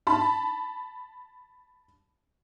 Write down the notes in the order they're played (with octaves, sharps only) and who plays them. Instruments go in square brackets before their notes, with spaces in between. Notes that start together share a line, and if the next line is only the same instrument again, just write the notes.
[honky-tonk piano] A5 B5